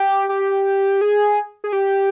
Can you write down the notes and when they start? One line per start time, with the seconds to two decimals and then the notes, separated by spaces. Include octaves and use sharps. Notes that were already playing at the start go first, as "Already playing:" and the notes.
Already playing: G4
0.29 G4
1.01 G#4
1.64 G#4
1.73 G4